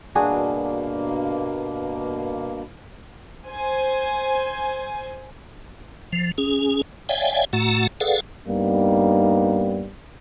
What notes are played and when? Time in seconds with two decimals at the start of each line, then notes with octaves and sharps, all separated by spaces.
0.15 G2 B2 A#3 D4 F#4 G#4
3.49 C5 G#5
6.13 F3
6.38 C#4 G#4
7.09 C#5 D5 E5 F5 G5 G#5
7.53 A2 A3 F#4 F#5 A#5
8.01 G#4 A4 B4 D5 F5 F#5
8.48 G2 G3 A#3 B3 D#4